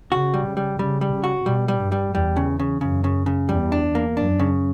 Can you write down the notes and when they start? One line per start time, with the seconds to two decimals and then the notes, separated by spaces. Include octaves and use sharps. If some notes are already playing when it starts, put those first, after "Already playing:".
0.11 C#3 F#4
0.34 G3
0.45 C#3
0.57 G3
0.79 C#3 G3
1.01 G3
1.13 C#3
1.24 F#4
1.46 B2 G3
1.68 G3
1.80 G2
1.92 G3
2.14 E2 G3
2.37 C#3
2.60 C#3
2.81 F#2 C#3
3.04 C#3
3.26 C#3
3.49 E2 G3
3.72 D4
3.95 A#3
4.17 F#2 D4
4.39 C#3